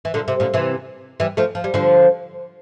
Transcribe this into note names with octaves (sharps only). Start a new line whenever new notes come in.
E3
A#2 D3
C3
A#2 D3
C3 E3
E3 G3
F3 A3
F3
G3
D3 F3